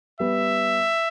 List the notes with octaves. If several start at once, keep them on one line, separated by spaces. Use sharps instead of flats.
G3 B3 E5